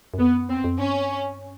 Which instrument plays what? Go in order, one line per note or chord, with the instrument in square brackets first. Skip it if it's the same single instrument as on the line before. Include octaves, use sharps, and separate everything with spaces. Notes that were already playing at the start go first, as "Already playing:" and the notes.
[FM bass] F#2
[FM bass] F2 [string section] B3
[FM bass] F#2
[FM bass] E2 [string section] C4
[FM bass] F#2
F2
[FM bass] G2 [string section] C#4